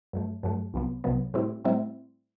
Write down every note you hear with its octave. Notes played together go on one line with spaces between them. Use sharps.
G2 F#3 A3
G2 F#3 A3
C2 C3 F#3 B3
C2 C3 F#3 B3
A2 G3 C4 E4
A2 G3 C4 E4